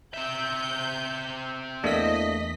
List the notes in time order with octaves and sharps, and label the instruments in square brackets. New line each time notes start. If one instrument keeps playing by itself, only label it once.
[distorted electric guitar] C4 E5 [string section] G6
[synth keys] E2 B6 [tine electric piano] A3 A#3 D4 [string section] D#5